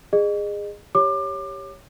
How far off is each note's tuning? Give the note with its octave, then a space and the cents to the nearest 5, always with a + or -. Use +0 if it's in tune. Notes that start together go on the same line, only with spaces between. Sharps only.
G#4 -15 D#5 -35
G4 +0 C#5 -5 D6 +30